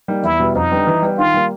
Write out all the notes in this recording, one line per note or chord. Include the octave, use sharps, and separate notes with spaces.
G3 A#3 D#4
E2 E4
B2 G3 B3
F2 D#4
D3 G3 B3
E3
G3 B3
D#3 F4
G3 A#3